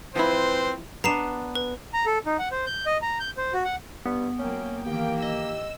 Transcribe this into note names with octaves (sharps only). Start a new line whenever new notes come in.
F3 C4 E4 B4 C5
B3 D4 A#5 C7 E7
B4
A#5
A4
D#4
F#5
C5
G6
D#5
A#5
G6
C5
F#4
F#5
G2 B3
F#3 A#3 C#4 G5
D#3 E3 A#3 G4 G5
D#5 E6